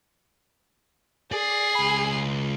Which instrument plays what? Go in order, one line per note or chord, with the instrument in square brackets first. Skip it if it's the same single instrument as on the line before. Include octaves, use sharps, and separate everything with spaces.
[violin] G#4 C7 [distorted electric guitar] D5
[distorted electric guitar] C#2 B5